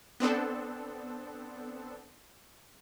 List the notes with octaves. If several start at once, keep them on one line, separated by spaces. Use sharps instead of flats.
B3 C4 D4 A4